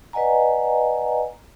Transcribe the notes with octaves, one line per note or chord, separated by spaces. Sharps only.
B4 D5 D#5 F#5 G#5 A#5